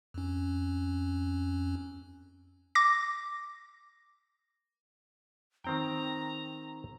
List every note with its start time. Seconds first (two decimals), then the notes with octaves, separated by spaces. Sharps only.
0.14 F2 C#4
2.75 D6 A#6
5.64 D#3 C4 G5 A#5